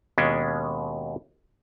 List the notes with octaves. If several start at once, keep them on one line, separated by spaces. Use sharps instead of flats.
D#2 B2 G#3 C#4 D4